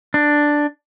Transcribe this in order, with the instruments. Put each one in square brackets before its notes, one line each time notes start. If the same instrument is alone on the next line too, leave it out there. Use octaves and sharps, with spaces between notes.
[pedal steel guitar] D4